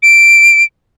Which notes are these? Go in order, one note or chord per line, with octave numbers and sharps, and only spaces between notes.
D7